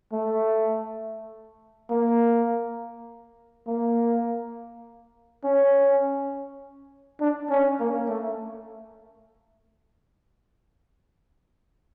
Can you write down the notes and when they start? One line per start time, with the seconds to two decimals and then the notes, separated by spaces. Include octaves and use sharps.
0.13 A3
1.90 A#3
3.67 A#3
5.44 C#4
7.21 D4
7.50 C#4
7.80 A#3
8.09 A3